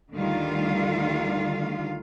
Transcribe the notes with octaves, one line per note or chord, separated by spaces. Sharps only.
D2 D3 D#3 G3 F4 F5